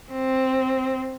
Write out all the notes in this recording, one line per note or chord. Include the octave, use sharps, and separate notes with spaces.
C4